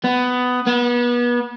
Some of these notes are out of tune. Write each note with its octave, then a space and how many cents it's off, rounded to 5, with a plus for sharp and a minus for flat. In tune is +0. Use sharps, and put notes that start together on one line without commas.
B3 +15
B3 -30